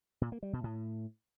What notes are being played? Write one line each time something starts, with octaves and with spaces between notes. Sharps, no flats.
A#2
A#3
G3
B2
A2